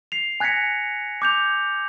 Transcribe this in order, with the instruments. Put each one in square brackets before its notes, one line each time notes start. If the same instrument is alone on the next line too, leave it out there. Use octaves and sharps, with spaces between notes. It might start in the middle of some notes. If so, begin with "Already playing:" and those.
[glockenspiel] C7 F7
G#5 F#6 G#6 A#6 B6 C#7
D6 G6 F7